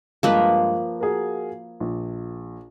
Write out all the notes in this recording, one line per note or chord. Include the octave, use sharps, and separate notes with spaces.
G2 F3 G#3 A#3 B4
F#4 G#4 A#4
A#1